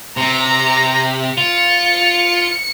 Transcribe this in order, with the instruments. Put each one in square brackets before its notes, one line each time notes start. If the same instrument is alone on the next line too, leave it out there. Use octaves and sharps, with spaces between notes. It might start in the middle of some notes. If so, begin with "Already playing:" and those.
[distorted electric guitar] C3 [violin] A#5
[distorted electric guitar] F4 [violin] C#7